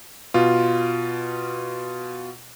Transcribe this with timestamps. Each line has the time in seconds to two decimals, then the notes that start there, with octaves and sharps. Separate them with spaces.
0.34 B2 F4